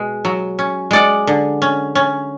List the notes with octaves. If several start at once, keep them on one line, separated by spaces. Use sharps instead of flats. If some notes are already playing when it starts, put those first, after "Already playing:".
Already playing: B2 G#3
F#3
C#4
G#3 D5 F#5
D3
C#4
C#4